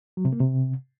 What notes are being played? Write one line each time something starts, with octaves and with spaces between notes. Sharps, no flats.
F#3
C3
A#3
C3